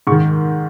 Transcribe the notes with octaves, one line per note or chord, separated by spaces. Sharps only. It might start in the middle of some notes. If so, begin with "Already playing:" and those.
G#2 D#3 C#6